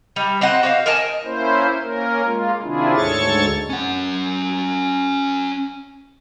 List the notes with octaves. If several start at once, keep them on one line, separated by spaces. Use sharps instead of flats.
G3 D#4
C4 C5 D#5 F#5
F#4 C5 F5
A#4 D#5 G#5 A5
A#3 C#4 E4 C5
A#3 C#4 A#4
G#3 A#3 F4
C3 D#3 D4 E4 F4 G#4
D2 G#2 A4 C#5 C#6 A6
C#4 F#5